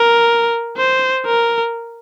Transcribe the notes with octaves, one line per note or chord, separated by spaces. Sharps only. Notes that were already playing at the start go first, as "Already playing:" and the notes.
Already playing: A#4
C5
A#4